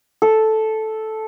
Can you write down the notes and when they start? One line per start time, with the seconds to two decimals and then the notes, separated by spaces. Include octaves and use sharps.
0.22 A4